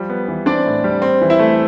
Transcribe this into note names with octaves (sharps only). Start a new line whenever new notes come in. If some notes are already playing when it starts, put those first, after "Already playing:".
Already playing: F3 G3
B3
E3
C4 D4 D5
A2
G3
C4
E3
E4 E5
A3